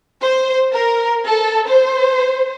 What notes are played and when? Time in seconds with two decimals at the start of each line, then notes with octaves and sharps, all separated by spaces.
0.21 C5
0.72 A#4
1.26 A4
1.68 C5